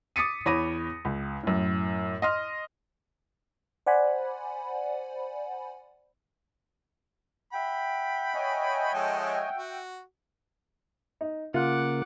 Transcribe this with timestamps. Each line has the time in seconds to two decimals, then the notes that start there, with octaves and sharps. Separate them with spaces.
0.16 D6 D#6 A6 B6 C#7 D#7
0.46 E2 C#5 B5 D6 A#6 D#7
1.05 C#2
1.43 F#2 A2
2.22 D#5 C6 F6
3.87 C5 D5 F#5 G#5 B5
7.53 E5 F#5 G5 B5
8.34 C#5 D#5 G#5
8.94 F3 G#3 A4
9.57 F#4
11.21 D#4
11.54 C#3 A#3 F4 F#5 D6